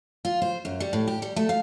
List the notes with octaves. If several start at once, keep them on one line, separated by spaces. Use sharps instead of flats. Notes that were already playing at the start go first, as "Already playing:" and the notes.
F4
C5
F#2
G3
A2
G4
G3
A3
F5